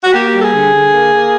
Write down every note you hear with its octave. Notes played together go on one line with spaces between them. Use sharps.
F#4
A#3 G4
G3 A4
G#4
D3
D3
A#3
A#3